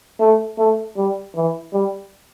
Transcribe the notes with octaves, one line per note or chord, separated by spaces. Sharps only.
A3
A3
G3
E3
G3